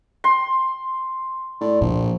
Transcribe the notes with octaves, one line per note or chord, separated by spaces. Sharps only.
C6
A2 D5
A#1 A#2 F3